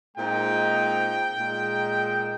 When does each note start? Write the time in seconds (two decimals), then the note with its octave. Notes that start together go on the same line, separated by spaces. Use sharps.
0.16 A#2 G#3 C4 D#4 G5
1.36 A#2 G#3 D#4